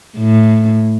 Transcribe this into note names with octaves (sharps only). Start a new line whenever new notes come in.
A2